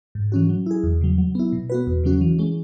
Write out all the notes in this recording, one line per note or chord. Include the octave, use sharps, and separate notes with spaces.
G#2
E3 C#4 F#4
F#3
E4 G#4
E2
C#3 F#3
F#3
B3 E4
B2
B3 F#4 B4
E2
C#3 F#3 C#4 F#4
E3
G#3 C#4